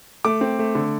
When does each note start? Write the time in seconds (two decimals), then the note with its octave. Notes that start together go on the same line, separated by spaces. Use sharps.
0.25 A3 D6
0.41 C4
0.59 A3
0.75 D3